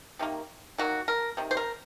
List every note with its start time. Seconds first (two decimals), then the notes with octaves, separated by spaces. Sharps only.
0.19 C3 D#3 A#3
0.78 D#3 F#3 A#3 F#4
1.08 A#4
1.37 C3 D#3
1.51 C5
1.57 A#4